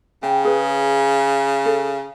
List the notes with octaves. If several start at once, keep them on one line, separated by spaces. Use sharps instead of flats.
C#3 G5
G#4 B4
A4